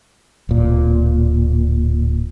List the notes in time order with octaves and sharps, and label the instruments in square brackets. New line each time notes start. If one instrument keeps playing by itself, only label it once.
[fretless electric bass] D1 A#2